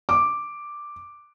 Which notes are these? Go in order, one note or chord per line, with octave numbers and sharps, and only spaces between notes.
D6